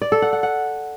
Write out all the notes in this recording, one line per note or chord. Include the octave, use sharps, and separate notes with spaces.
D5
A4
F#5
F#5
F#5